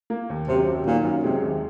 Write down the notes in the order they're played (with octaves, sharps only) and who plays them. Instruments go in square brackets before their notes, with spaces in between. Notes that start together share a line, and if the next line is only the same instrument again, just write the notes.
[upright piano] A#3
D#2
[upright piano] F#2 [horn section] C3
[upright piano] F#3
[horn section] A#2 [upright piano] D#3
[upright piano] F#2
[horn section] C3 [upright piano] G#3
[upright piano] D#2